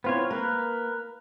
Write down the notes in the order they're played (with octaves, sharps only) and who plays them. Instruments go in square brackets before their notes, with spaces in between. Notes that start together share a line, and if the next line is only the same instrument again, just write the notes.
[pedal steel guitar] B3 F4 C#5 [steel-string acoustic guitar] C4 E4
[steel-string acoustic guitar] A#3 [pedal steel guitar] A#4 B4